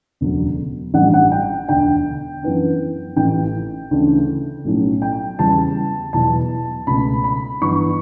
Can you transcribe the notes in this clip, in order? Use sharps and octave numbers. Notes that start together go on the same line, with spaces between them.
E1 D2 C#3 F#3
A1 G2 D3 G3 F#5
F#5
G5
E1 D2 D3 G5
F#2 E3 B3 D4
A1 A2 E3 A3 G5
D2 C#3 E3 A3 D4
B1 A2 F#3 A3 C#4
G5
E2 C#3 G3 A5
E1 E2 B2 F#3 A5
C#2 B2 A3 B5
B5
G1 G2 E3 B3 D4 C#6